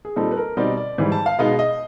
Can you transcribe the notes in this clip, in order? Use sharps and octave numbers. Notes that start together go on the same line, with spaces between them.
G#4
A#2 G3 C4 D#4 A4
B4
A#4
B2 G3 C4 D#4 D5
D5
G#2 E3 G3
A5
F5
B2 G#3 B3 D#4 F5
D#5